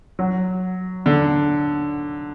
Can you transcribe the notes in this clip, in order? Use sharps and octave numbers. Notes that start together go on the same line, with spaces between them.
F#3
D3